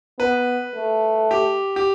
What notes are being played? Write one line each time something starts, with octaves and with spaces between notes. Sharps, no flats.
B3 B4
A3
G4
G4